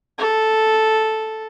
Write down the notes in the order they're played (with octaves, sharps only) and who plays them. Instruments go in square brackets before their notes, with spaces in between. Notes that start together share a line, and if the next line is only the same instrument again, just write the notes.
[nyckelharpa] A4